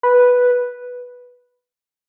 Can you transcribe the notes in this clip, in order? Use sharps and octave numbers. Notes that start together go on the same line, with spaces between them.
B4